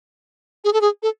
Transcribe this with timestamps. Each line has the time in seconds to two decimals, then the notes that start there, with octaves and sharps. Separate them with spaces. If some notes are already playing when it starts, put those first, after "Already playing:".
0.64 G#4
0.73 A4
0.81 G#4
1.03 A4